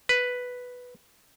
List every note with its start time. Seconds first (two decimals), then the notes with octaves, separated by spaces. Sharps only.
0.09 B4